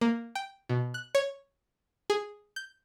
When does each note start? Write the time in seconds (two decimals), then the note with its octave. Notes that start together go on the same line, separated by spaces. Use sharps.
0.01 A#3
0.35 G5
0.69 B2
0.94 F#6
1.15 C#5
2.10 G#4
2.56 G6